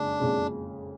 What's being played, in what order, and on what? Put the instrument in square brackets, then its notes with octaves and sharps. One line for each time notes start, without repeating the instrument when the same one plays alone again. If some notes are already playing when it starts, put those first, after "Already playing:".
Already playing: [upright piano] F#1 F2 C#3 G#3 [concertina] D4
[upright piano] F#1 F2 C#3 G#3